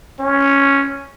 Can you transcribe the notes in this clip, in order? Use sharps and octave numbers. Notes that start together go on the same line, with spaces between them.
C#4